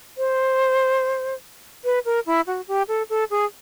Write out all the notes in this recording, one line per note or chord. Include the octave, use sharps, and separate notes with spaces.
C5
B4
A#4
E4
F#4
G4
A4
A4
G#4